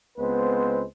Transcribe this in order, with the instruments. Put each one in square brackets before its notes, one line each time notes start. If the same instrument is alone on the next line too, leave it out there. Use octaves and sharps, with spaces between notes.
[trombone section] C#2 G#3 B3 C4 B4 C5